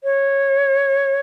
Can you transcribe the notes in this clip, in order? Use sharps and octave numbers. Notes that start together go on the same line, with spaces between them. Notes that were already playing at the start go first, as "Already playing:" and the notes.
C#5